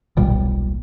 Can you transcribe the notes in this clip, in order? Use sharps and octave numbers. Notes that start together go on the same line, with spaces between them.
D#1 B1 A#2 G3